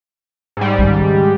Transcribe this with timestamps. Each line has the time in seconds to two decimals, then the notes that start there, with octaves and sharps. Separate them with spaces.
0.57 G#2 G3
0.79 D#2 C#3